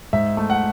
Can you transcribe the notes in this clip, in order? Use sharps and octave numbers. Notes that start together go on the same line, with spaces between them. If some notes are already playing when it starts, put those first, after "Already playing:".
G#2 E5
A3
F#5